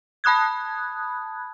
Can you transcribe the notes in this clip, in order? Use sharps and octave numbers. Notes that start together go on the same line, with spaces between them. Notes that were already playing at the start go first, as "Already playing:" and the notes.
A5 B5 D#6 F#6 G#6